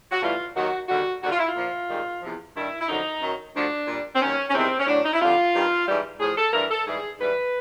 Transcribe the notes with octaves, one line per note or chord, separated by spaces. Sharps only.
F#4
A2 E3 G3 F4
D#2 D#3 F#3 F#4
D#2 D3 G3 F#4
D#2 D3 G3 F#4
F4
E4
F4
A#2 F3
G#2 D#3 G3
E2 C3 F3
G2 D#3 G3 E4
E4
F#2 D3 F3 D#4
F#2 D#3 F#3
D2 D3 F3 D4
A#2 G3
C4
D#2 D#3 F#3 C#4
C#4
E2 C3 D#3 G3 C4
C#4
A2 F#3 D4
D#4
E4
F2 D3 G3 F4
G2 D#3 G3
G#2 E3 G3
A2 F3 G#4
A4
G2 E3 G3 A#4
A4
G#2 E3 G3 G#4
G#2 E3 G3 B4